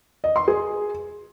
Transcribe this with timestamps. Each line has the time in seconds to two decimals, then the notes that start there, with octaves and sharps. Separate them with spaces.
0.24 D#5
0.36 C6
0.48 G#4